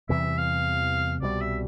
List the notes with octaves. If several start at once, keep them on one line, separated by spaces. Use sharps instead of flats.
E2 C3 E3 G3 E5
F5
C2 B2 G3 D5
E5